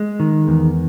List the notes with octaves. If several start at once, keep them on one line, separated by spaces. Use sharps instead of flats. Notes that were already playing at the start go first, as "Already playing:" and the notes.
Already playing: G#3
D#3
E2